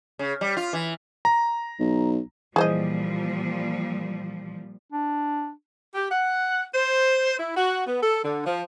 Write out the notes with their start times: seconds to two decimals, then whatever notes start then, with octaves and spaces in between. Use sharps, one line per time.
0.19 C#3
0.41 G3
0.57 F4
0.73 E3
1.25 A#5
1.79 B1
2.56 A#2 E3 F3 G3 G#4 C5 D#5
4.93 D4
5.94 G4
6.11 F#5
6.74 C5
7.38 E4
7.55 F#4
7.85 B3
8.02 A4
8.23 D3
8.45 F3